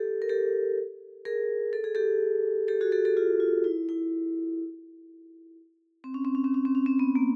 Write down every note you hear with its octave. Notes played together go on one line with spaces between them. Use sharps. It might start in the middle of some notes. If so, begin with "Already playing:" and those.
Already playing: G4 A4
A#4
G4 A4
G#4 A#4
A4
G#4
G4 A4
G4 A4
F#4 G#4
G4 A4
G4 A4
F4 G4
F4
E4
E4
C4
C#4
C4
C#4
C4
C#4
C4
C#4
C4
B3
A#3